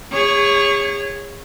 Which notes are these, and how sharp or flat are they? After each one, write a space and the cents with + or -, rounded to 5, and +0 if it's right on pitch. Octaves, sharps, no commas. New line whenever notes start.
G#4 -35 C#5 +0